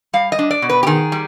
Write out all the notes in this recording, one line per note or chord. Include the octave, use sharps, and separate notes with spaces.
G3 F5
D#5
D4
D5
B2
B4
G4
D#3 G#4
G3